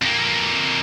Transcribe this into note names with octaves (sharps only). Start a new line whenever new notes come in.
F2 A#3